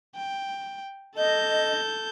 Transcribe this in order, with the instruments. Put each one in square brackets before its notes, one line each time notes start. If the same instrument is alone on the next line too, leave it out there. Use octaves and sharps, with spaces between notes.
[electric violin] G5
[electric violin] A4 G6 [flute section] D#5